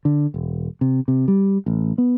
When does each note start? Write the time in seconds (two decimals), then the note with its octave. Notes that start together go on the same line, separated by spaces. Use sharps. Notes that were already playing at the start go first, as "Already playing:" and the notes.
0.05 D3
0.34 E1
0.81 C3
1.08 C3
1.28 G3
1.66 A1
1.98 B3